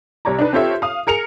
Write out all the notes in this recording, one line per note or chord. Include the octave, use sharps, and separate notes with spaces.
C2 C3 C#5 D5 A#5
D4 D#4 B4
C4 F4 G4 A4 C#5 E5
F5 D#6
G#4 A#4 C#7 F7